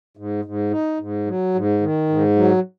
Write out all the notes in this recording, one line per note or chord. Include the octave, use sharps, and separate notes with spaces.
G#2
G#2
D#4
G#2
F#3
G#2
D#3
G#2
F#3